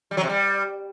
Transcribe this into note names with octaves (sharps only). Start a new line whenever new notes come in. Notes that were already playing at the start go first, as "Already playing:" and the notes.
G3
F#3
C3
G3